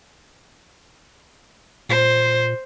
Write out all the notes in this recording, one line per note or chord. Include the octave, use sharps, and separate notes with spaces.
A#2 C5